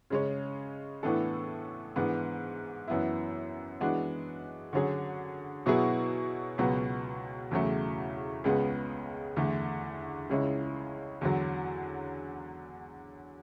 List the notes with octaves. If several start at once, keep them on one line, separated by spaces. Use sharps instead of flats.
C#3 G#3 C#4
A2 E3 B3 D4 A4
G#2 E3 B3 D4
F#2 E3 B3 E4
E3 G#3 B3 D4 F#4
D3 F#3 C#4 G#4
B2 F#3 B3 E4 G#4
C#2 B2 F#3 B3
E2 C#3 F#3 A3
C#2 C#3 G#3 B3
E2 D3 A3
C#2 C#3 G#3 C#4 E4
E2 D3 F#3